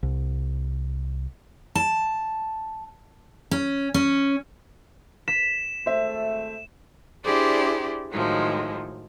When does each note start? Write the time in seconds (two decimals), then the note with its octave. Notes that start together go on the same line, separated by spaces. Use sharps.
0.03 C2
1.75 A5
3.51 C#4
3.94 C#4
5.28 B6 E7
5.86 G#1 A3 C5 E5
7.25 D4 E4 G4 G#4 C5 D5
8.13 A2 D#3 F3 F#3 G#3